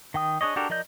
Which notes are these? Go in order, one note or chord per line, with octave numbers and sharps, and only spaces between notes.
D#3 G5 D#6
D4 G#4 C#5 D#5
D4 F#4 G4 A4 A#4
F3 A#4 D5 D#5 G6